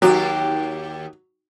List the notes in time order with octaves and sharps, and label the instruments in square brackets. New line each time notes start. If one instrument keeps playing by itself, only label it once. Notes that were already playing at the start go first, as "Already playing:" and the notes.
[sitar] D#2 G4 [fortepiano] F#3